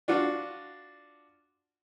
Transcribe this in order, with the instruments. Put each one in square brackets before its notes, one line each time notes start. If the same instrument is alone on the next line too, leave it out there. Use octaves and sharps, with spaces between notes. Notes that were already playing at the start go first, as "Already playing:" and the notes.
[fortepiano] D4 F4 F#4